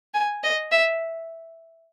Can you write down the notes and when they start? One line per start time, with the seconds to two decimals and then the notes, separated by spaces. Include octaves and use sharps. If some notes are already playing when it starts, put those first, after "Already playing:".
0.14 G#5
0.43 D#5
0.71 E5